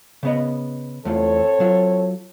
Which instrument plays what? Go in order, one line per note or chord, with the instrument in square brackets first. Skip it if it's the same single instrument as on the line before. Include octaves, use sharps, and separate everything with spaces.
[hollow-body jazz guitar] C#3 B3 D#5
[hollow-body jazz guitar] E2 A3 F4 [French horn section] C4 A4 C#5
[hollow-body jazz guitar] F#3 F4